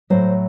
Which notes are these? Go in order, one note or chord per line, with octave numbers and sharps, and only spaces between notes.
A2 F#3 C5